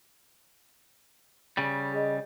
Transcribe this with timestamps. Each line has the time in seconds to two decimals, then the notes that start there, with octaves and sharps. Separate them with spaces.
1.57 C#3 G3
1.92 G#4 D#5